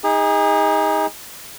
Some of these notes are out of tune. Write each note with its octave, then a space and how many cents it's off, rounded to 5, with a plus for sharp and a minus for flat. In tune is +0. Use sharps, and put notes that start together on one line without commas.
D#4 +20 G#4 -30